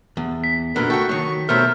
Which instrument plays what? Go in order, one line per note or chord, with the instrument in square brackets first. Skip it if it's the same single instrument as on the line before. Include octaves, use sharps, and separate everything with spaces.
[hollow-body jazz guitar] E2
[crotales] B6
[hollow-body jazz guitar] F#2 A#2 D3 [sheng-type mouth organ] A#4 B4
[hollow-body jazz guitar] A3 A4 [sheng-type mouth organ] F#4 G5 C#6
[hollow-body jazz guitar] D#3 F#3 [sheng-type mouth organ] C#6
[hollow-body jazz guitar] B2 F#3 A3 [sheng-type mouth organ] A#4 C5 E5 [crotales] F6